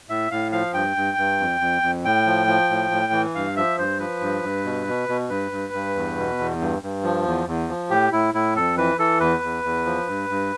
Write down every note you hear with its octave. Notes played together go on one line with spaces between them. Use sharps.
A2 E5
A2 F5
F3 F5
G2 G5
G2
G2
F2
F2
F2
A2 G5
F3
F3
A2
A2
E3
G2 F5
F3 E5
G2 C5
F3 B4
G2
G2
B2
B2
B2
G2 B4
G2
G2
E2
B2
E2
G2
G2
F3
E2
E2
F3
A2 G4
A2 E4
A2 E4
F2 A4
E3 B4
E3 A4
E2 B4
E2
E2
F3
G2
G2